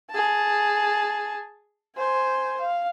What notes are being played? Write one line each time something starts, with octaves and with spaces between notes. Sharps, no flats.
G#4 A5
C5 G#5
F5